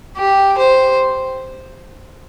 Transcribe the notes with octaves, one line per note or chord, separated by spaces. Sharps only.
G4
C5